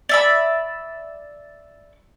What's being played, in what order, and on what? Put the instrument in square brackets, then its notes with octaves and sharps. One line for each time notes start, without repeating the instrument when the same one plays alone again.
[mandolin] D5 E5 B5